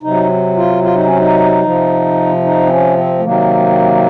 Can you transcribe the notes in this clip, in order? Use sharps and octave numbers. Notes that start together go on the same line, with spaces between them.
C3 F#3 D#4
F4
F4
D#4
C#4
D#4
C3 F3
D#4
C4
C#4
C4
A3
C3 D#3 F#3 A#3